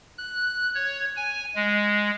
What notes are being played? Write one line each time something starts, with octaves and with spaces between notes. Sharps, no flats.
F#6
C#5
G#5
G#3